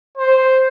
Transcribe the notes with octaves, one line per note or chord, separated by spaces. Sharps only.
C5